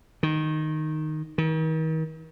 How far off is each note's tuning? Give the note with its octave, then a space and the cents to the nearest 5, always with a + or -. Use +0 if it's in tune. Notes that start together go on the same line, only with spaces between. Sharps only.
D#3 -5
D#3 +40